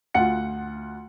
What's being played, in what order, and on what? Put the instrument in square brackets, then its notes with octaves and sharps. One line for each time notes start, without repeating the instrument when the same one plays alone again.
[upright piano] D2 F4 F#5 C#7